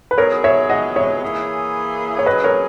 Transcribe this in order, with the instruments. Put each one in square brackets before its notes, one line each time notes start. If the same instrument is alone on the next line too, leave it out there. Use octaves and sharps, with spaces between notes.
[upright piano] B4
[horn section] F#3 B3 D#4 G#4 [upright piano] A#4 C#5
[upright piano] C#5 E5
D#5 F#5
C#5 E5
[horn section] E3 A#3 E4 G#4
[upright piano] C#5
[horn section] F#3 C#4 G#4 [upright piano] B4 D#5
[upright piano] A#4 C#5